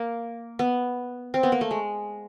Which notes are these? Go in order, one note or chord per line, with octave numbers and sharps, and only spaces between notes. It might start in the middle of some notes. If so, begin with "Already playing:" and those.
Already playing: A#3
B3
C4
B3
A#3
A3
G#3